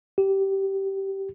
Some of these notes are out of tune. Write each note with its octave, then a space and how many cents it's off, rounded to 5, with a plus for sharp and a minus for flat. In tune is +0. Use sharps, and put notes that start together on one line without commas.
G4 -15